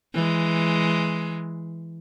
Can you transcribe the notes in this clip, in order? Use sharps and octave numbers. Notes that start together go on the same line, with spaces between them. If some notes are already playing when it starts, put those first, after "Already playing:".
E3 G#3